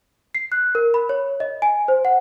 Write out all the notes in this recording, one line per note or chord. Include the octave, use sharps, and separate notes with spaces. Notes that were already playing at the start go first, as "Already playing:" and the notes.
C7
F#6
A#4
B5
C#5
D#5
G#5
C5
F#5